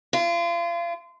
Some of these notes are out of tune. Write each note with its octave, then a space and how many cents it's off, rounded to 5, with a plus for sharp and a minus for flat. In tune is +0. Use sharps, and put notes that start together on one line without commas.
F4 -35